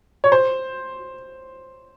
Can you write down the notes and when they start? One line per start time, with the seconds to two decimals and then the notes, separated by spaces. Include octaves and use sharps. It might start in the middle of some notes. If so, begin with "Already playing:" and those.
0.24 C#5
0.32 C5